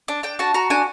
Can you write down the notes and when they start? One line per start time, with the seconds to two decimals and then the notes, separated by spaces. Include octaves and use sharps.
0.08 D4
0.23 D4 G5
0.39 F#4 A5
0.54 F#4 A#5
0.70 D4 G#5